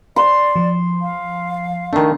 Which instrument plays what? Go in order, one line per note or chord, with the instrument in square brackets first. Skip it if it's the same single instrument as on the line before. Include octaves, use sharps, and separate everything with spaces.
[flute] D5 [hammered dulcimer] C6
[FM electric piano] F3
[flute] F5
[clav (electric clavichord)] D#3 A3 [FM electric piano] D4